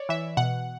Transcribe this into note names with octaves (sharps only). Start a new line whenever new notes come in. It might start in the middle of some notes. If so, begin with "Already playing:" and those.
Already playing: C#5 D5
E3 E5
B2 F#5